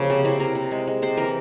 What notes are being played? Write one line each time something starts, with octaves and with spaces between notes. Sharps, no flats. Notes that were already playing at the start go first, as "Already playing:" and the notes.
Already playing: C#3 F3 A#3 G4
C3 C#4
C3 E4
C3 A#4
C3
G#3
G#3
C3 C5
E3 A#4